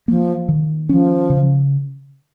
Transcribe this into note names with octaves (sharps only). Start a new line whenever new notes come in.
F3 A#3
D#3
F3 C#4
C#3